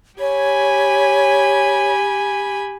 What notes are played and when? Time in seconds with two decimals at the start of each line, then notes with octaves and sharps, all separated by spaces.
0.20 G4 C#5 G#5 B5